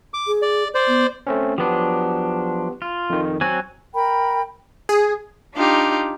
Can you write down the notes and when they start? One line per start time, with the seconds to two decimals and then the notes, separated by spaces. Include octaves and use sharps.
0.14 D6
0.27 G#4
0.42 D5
0.75 C5 D5
0.88 B3
1.27 A3 C4 C#4
1.58 F3 F#3 B3 D4 G4
2.82 F4
3.10 F2 D#3
3.41 F#3 C4 F#4 G#5
3.93 A#4 G5 B5
4.89 G#4
5.54 D4 D#4 F4 G4